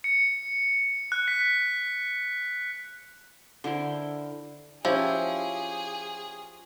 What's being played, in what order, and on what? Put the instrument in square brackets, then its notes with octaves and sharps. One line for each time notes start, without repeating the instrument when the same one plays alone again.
[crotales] C#7
F#6
B6
[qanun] D3 E4 A#4 C5
[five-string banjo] F3 [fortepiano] C#4 G4 [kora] E4 [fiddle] G#4